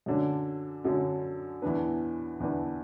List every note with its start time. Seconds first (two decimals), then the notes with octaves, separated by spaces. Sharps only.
0.06 F#2 D3 F#3 D4
0.84 F#2 D3 F#3 D4
1.62 E2 E3 B3 D4 B4
2.40 E2 E3 B3 D4 B4